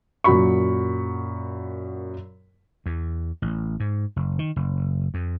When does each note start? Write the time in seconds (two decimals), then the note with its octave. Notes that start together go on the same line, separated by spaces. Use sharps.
0.24 F#2 A#2 F#4 B5 C#6
2.86 E2
3.42 A1
3.80 G#2
4.16 F#1
4.39 D#3
4.56 F#1
5.14 F2